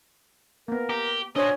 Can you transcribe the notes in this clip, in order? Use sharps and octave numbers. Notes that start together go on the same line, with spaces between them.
A#3 B3 A#4
G4 A#5
D4 F#4 C5 C#5 D#5 G#5